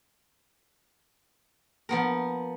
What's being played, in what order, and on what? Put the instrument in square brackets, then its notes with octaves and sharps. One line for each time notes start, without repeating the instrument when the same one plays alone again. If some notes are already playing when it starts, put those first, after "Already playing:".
[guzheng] F3 B3 A#4